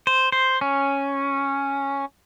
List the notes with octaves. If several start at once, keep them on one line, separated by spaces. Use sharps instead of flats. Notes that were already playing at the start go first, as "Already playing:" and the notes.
C5
C5
C#4